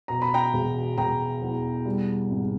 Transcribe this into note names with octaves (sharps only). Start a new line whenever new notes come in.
B2 A#5
B5
G5 A#5
E1
E1 G5 A#5
E2
G3
G#1